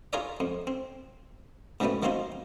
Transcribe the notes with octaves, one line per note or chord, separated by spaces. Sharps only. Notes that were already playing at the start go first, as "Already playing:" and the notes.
F4 G#4 A#4 C#5 D5 E5
F2
C4
G#2 C#3 F#3 G3 A3 B3
D#3 F#3 A#3 C4 D#4 F4